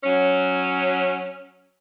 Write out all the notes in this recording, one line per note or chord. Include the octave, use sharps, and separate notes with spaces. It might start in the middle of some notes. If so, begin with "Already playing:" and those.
F#3 C#4